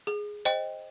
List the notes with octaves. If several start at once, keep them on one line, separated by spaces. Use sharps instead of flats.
G#4
C5 D#5 G5